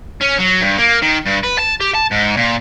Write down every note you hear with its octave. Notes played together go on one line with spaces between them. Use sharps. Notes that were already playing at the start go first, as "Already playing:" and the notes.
C#4
F#3
G2
A#3
D#3
G2
B4
A5
G4
A5
G#2
A#2